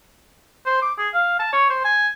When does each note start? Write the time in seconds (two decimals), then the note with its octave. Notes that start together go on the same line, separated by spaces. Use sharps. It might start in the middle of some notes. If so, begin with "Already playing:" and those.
0.66 C5
0.82 D6
0.98 G#4
1.14 F5
1.40 A5
1.53 C#5
1.70 C5
1.85 G#5